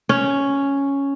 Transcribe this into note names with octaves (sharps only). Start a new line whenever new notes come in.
C#4